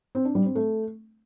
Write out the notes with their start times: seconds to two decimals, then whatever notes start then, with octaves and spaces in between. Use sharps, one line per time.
0.15 C4
0.25 D4
0.35 G3
0.45 C4
0.55 A3